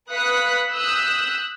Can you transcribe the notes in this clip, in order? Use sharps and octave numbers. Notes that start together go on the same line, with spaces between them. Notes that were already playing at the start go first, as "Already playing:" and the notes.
B4 F5 D#6 F#6 B6 C#7
D#6 E6 F#6 G6 B6